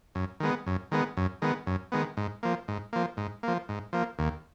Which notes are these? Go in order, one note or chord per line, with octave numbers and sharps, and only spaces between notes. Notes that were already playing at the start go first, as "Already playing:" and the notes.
F#2
D#3 G#3 B3
F#2
D#3 G#3 B3
F#2
D#3 G#3 B3
F#2
D#3 G#3 B3
G#2
F3 A#3
G#2
F3 A#3
G#2
F3 A#3
G#2
F3 A#3
D#2